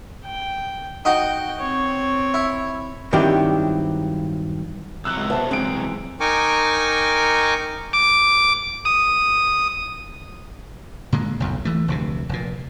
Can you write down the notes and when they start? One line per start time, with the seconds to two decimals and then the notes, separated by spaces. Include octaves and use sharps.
0.25 G5
1.05 D#4 F#4 G5
1.59 C4 C#5
2.34 E4
3.13 G2 D#3 F#3 C4 E4 G4
5.05 C2 F#3 E6 F#6
5.17 C#2
5.30 B3 C4 E5 A5
5.51 E3 G#3 C4 D7
6.20 D#4 A#4 G5 G#5 C#6 D6
7.93 D6
8.85 D#6
11.13 A#2 D3 G#3
11.40 F#1 B1 F2
11.65 E3 A3
11.88 F1 D2 C3
12.29 F1 A#2